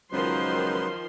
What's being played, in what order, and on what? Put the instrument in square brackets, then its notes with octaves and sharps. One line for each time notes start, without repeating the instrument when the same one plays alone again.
[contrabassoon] C#2 [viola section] D#3 F3 C6 [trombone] F#3 [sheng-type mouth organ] D#4 B4 C5